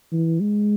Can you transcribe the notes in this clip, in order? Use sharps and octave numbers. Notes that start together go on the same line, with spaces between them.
E3
G#3